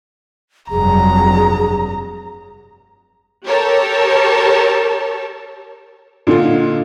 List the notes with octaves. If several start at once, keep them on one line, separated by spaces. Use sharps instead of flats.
F1 G2 F#3 G#4 A#5
G4 A4 A#4 C#5 A5
A#2 D3 D#4 F4